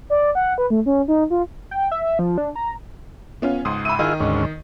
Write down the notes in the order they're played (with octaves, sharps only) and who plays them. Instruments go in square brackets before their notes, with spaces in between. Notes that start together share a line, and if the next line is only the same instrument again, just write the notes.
[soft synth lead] D5
F#5
B4
A3
C#4
D#4
F4
[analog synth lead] G5
E5
F3
D4
A#5
[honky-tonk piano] B3 C#4 F4
[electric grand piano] C#2 G#2 C6 [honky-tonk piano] D#6
[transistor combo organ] E5 [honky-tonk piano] B5 D#7
[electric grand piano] D#3 [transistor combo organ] E4 F4 G#4 [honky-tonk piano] D#5
[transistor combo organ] D2 G#2 C#4